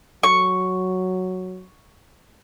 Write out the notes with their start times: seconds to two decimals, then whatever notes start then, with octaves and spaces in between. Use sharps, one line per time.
0.23 F#3 C#6